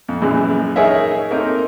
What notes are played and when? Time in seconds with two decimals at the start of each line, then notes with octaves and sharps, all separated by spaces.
0.09 F2
0.22 A#1 F#2 E3 G#3
0.76 D#4 G#4 A#4 C#5 D#5 E5
1.31 A3 A#3 C4 D#4 A#4